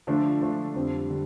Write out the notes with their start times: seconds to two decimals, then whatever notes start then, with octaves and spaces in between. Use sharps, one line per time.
0.07 D3 F3 A3 D4
0.41 D3 F3 A3 D4
0.75 F2 D3 G3 C4
1.10 D3 G3